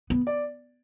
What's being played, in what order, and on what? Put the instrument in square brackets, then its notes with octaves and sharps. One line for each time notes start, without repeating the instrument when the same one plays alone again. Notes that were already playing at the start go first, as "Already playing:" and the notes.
[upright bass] B3
[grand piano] D5